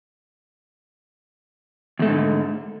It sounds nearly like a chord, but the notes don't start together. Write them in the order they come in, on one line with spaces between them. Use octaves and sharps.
E2 A3 G#2 D3